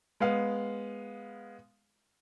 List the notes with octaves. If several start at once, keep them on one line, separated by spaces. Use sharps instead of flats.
G#3 B3 F5